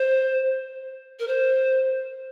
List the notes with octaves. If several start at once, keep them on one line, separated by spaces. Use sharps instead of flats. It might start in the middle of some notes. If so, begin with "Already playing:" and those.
Already playing: C5
A#4
C5